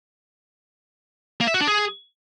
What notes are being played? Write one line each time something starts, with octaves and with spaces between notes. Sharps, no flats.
A#3
E5
F#4
D4
G#4